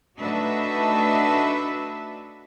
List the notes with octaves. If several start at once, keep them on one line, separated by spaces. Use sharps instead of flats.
A3 D4 D#4 F#4 B4 E5